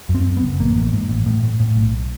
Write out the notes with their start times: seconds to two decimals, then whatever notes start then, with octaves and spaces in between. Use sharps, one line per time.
0.09 F#2
0.15 C4
0.26 F#2
0.37 B3
0.42 F#1
0.60 A1 A#3
0.76 A1
0.93 G#2
1.09 A1
1.26 A2
1.43 A2
1.60 A2
1.75 B1